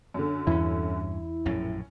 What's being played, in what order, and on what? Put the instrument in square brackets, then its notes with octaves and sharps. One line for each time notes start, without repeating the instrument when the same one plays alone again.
[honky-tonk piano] F#2 D3
[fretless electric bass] E2 [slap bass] G2 C#4 [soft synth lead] E4
[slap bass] A#1 F#2 A2 [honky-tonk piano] C#4